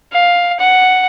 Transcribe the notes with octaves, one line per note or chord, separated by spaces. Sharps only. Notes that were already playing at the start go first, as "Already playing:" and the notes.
F5
F#5